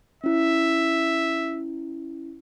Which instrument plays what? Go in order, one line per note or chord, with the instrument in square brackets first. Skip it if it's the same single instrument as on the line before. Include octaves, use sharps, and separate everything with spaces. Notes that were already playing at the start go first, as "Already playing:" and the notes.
[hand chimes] C#4 E4 [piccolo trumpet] E5